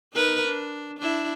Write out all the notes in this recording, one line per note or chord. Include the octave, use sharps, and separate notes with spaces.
D#4 A#4 B4
D4
D4 E4